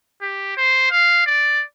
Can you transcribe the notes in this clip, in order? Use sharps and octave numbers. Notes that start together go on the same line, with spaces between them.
G4
C5
F5
D5